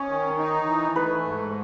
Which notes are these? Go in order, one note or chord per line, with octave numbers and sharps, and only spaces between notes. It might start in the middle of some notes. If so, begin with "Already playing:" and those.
Already playing: C#4 C#5 D#5
D#3
D#4
E3
A3 B4
G#2